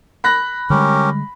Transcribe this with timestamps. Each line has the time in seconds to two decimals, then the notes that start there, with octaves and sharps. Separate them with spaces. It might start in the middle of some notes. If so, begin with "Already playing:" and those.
0.24 B5 F#6 A#6
0.70 D3 G3 G#3 C#4 G4 A#4